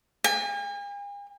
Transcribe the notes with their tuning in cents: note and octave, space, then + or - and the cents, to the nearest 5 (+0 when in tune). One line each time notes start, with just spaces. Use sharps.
G#5 -45